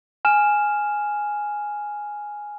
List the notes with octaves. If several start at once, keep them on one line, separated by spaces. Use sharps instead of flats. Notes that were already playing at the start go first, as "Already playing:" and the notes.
G#5 F6 E7